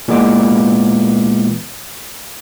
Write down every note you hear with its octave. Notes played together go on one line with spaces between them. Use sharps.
A#2 E3 G#3 B3 D6